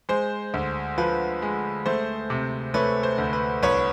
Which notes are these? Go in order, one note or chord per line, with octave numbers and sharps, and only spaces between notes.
G#3 C5
D2
F3 B4
G#3
A3 C5
C3
A3 B4 C#5
C5
D2
B4
C2 B4 C#5